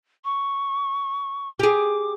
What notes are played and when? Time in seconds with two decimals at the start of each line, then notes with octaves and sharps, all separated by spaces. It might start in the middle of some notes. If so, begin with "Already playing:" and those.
0.25 C#6
1.59 G4 G#4 D6